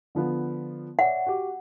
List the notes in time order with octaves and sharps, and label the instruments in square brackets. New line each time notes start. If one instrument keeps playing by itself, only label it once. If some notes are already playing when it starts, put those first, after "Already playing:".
[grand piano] D3 F3 B3
[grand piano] C#5 D5 E5 [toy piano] F#5
[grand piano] F#4 G4